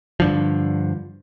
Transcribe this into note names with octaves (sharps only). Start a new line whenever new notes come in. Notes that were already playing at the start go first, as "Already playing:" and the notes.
G2 D3 F3